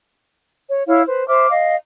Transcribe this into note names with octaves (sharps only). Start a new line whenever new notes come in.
C#5
E4 C#5 F5 F6
B4 C5
C5 E5 D6 F6
D#5 F5